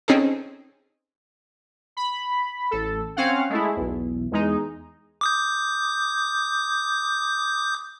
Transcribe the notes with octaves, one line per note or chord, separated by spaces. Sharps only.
C4 C#4 D#4 G#4 A4
B5
A1 A4
C4 C#4 F5 F#5
G#3 A3 E4
B1 E2
E2 G#3 D#4
D6 D#6 G6